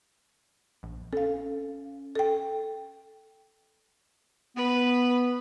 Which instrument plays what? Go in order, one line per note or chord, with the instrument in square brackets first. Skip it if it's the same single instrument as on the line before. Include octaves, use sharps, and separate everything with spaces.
[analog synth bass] A#1
[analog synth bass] C#4 [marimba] A4 F5
[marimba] A4 G5
[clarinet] B3 [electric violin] B4